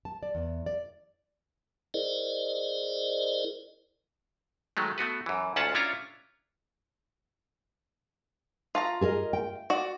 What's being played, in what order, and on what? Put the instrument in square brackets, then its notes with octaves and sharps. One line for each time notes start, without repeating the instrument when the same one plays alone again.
[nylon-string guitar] A5
D5
E2
D5
[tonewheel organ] E4 G#4 A#4 C5 D5 D#5
[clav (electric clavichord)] D#3 F#3 G#3 A3
A3 B3 F#4 B4
F#2 E3
D2 G#2 C#4 F4 F#5 A5
C#4 D4 E4 F4 C#5 A#5
[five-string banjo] F4 A5 A#5
[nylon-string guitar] G#4 A#4 D#5
G5
[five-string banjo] F#4 D5